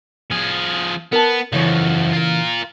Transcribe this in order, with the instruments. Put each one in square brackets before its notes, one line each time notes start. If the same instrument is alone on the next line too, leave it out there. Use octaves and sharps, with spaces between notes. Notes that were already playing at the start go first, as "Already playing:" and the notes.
[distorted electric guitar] F3 G#4
[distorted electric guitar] B3 [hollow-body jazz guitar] A#4 A5
[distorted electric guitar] F#2 F3 [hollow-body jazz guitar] C#3 E3 C#5
[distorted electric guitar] F4 A#4